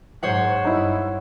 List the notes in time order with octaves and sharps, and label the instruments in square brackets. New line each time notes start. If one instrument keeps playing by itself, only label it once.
[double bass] G#2 F#3 [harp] C5 C#5 F#5
[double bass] G2 [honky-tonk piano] D#4 E4